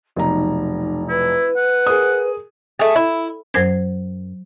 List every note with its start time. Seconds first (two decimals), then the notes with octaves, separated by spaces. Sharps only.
0.16 F1 B1 D#4 A#5
1.09 E4 B4
1.56 F#5
1.87 G#4 A#4 D#6
2.79 A3 G#4
2.96 E4
3.54 F#2 F#3 C5 G#6